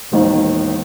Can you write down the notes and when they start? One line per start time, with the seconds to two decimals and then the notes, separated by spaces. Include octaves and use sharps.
0.12 E1 A#1 D#3